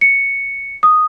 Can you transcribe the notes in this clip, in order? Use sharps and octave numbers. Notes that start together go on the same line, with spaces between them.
C#7
D#6